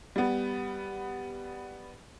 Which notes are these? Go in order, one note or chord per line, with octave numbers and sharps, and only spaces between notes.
G3 B3